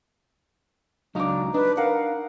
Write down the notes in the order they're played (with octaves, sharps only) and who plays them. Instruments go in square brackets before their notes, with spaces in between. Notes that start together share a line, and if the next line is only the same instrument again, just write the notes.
[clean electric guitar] C#2 F#3 F5 [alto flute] D4 [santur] D#4 D6
[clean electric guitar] D4 [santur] D#4 [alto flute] B4
[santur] A#4 F#5 [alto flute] F5